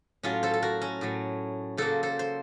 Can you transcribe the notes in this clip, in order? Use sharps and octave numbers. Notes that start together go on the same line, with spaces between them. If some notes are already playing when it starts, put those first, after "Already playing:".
A2 F#3 A3 C#4 F4
A4 C5
A4
F#4 A#4
C#4
A2 F#3 A3
C#3 F#3 A#3 A4 C5
A4 C5
C5